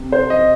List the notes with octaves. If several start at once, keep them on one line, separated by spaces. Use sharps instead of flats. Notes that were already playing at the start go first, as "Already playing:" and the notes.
Already playing: C3
C5
D#5